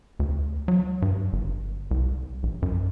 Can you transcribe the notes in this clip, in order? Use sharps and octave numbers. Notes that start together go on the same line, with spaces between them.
D2
F#3
G2
G1
C2
A#1
F#2